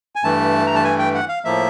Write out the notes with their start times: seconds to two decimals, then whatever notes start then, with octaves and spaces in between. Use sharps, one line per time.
0.16 G#5
0.23 G2 E3 A3 A5
0.67 A#5
0.75 A5
0.84 G#5
0.99 G5
1.14 F#5
1.29 F5
1.45 A2 F3 A#3 E5